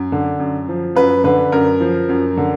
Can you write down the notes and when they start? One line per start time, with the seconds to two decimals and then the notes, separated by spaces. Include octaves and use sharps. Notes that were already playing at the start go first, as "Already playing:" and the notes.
Already playing: F#2
0.12 D3
0.40 F#2
0.69 F3
0.95 F#2 B4
1.24 D3 B4
1.52 F#2 A#4
1.80 F3
2.09 F#2
2.37 D3